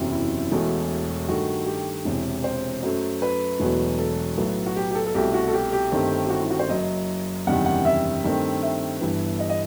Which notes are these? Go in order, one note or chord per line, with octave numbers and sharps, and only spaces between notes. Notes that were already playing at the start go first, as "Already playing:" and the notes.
Already playing: F#1 E2 C3 F#3
E4
E1 E2 B2 A3
G2 D#3 A3 F#4
G4
E1 E2 C3
C5
F#2 F#3 A3
B4
E1 E2 B2 F#3 A3
A4
B1 A2 F#3 B3
F#4
G4
G4
A4
A4
C2 B2 A3 G4
F#4
A4
G4
G4
G1 G2 D#3 A3 C4
G4
F#4
E4
F#4
C5
F#1 F#2 F#3 D#5
F#1 E2 C3 D#3 G3 F#5
F#5
E5
G2 D#3 A3 C4
E5
G1 G2 E3 B3
D#5
D#5